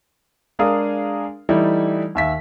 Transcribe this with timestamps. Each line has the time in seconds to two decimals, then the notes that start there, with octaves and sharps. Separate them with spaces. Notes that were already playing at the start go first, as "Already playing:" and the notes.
0.59 G#3 D4 G#4 A#4 F5 D#6
1.49 E3 G3 A3 D#4 E4
2.15 D#2 E5 B6